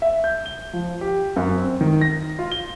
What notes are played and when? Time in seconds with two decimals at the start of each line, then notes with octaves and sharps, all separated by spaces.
0.02 E5
0.24 G6
0.46 G7
0.73 F3
1.01 G4
1.36 F#2
1.56 C4
1.81 D#3
2.01 A#6
2.39 F4
2.52 G7